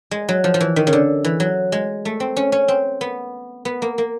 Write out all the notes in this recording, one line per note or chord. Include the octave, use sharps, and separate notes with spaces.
G#3
F#3
F3
F3
E3
D#3
C#3
D3
E3
F#3
G#3
A3
C4
C#4
C#4
C4
B3
B3
A#3
A#3